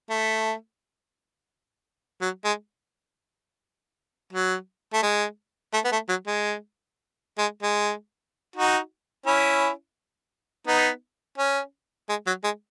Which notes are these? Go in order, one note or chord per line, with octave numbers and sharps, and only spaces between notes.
A3
F#3
G#3
F#3
A3
G#3
A3
B3
A3
F#3
G#3
G#3
G#3
D#4 F#4
C#4 E4
B3 D#4
C#4
G#3
F#3
G#3